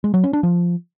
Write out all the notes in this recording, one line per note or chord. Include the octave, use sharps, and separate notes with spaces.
G#3
F#3
C#4
D4
F3